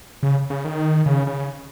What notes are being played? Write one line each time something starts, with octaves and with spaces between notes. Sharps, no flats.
C#3
C#3
D#3
C#3
C#3